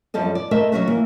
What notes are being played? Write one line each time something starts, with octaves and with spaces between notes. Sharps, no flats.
F#2 F3 G3 A4 D#5
D5
A3 A#4 C5 D#5 E5
F#3 A#3 C#4 F#4 E5 F#5
E3 A#3